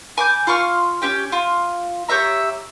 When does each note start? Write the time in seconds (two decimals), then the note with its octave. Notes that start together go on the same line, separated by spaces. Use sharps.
0.17 G#5 D6 G6
0.47 F4 C6 C#6 F6
1.02 C#4 G4 G5
1.32 F4
2.08 G4 C#5 E5 A#5